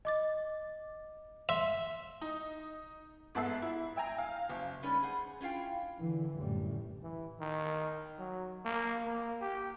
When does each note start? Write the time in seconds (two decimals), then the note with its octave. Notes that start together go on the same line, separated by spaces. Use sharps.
0.05 D#5 D6 A6
1.49 E5 C6
2.21 D#4
3.35 G#2 B3 A4 E5 C7
3.62 E4
3.96 E5 G5 G#5 A#5
4.18 F5
4.50 F#1
4.82 G3 G#3 C#4 D#4 B4 D5
5.02 G#4 C5 F#5
5.41 C#4 E4 F4 F5 G5
5.98 D3 E3
6.33 A#1 F#2 A2 D3 G3
7.03 E3
7.40 D#3
8.19 F#3
8.65 A#3
9.05 A#3
9.41 G4